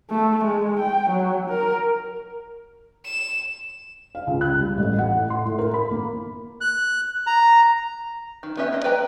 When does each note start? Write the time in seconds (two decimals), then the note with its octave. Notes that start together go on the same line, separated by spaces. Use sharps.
0.10 A3
0.44 G#3
0.79 G5
1.10 F#3
1.50 A#4
3.05 E7
4.15 F5
4.27 C#2
4.41 F#6
4.61 G3
4.77 A1
4.99 F#5
5.13 A2
5.30 C6
5.45 A2
5.58 A#4
5.74 B5
5.91 A#3
6.61 F#6
7.27 A#5
8.43 D#3
8.57 B3 C#4 G4 E5
8.72 A#3 D#5
8.84 B4 D5 G5 A#5